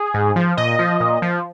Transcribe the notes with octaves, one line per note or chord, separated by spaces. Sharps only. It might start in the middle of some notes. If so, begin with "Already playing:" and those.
Already playing: G#4
G#2
F3
A#2 D#5
F3
A#2
F3